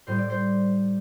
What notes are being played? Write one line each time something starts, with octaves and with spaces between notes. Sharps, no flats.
A2 G3 C5
D5
C5